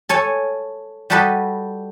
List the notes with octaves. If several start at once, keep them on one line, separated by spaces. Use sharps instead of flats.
A4 C#5 G#5
G3 F#4 G4 A4 B4 D#5